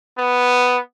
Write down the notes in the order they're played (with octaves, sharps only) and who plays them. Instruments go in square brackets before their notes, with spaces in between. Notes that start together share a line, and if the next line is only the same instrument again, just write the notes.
[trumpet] B3